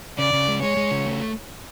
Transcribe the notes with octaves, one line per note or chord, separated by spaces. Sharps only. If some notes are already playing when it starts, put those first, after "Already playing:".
C#3 D5
C#3
G#3
G#3 C#5
G#3
C#3
A3